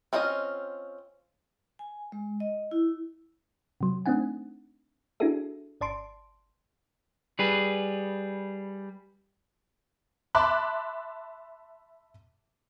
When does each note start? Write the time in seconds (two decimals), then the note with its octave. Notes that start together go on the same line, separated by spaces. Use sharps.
0.13 C4 C#4 F4 G#4 D#5
1.79 G#5
2.12 G#3
2.40 D#5
2.71 E4
3.81 C3 F#3
4.06 A3 C4 D4 D#4 F#5 G#5
5.20 D4 E4 F#4 G#4 A4 E5
5.81 G1 D5 A5 C6 D7
7.39 G3 G#4 B4
10.35 E5 A5 B5 C6 D6 F#6